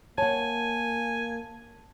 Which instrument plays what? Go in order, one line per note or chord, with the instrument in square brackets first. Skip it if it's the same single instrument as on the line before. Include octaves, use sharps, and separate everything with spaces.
[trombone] A#3 [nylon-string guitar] C#5 F#5 [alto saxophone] G#5 [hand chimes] A5